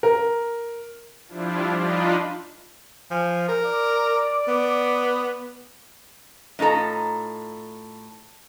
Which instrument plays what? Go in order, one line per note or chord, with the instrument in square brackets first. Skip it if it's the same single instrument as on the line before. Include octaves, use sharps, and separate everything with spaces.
[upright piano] A#4
[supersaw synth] F3 G3 D4 E4 F4
D4 D#4 F4 D#5 B5
[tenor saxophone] F3 [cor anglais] G#5
[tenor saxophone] A#4
[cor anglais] D5
[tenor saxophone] B3
[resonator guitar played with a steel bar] A2 D#4 F4 A4 A#5